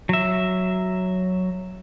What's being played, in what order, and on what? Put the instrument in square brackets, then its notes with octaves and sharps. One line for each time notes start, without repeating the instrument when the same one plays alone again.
[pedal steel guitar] F#3 E5